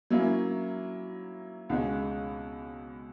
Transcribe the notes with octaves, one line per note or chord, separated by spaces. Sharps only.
F#3 A#3 C#4 E4
C#2 B2 G#3 C#4